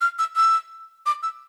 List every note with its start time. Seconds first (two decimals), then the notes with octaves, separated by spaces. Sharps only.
0.01 F6
0.19 E6
0.36 E6
1.06 D6
1.23 E6